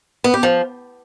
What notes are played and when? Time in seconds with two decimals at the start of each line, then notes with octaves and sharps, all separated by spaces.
0.24 B3
0.34 G4
0.43 F3